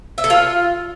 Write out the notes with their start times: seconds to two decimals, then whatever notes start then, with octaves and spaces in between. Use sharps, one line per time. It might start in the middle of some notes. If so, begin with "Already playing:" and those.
0.18 E5
0.24 A4
0.30 F4